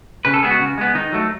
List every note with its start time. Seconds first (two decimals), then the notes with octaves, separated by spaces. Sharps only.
0.25 C#3 B4
0.34 A4
0.43 G#3 B3 G#4
0.51 F#4
0.59 C#3
0.78 G#3 B3
0.94 D#3 D#4
1.12 F#3 A3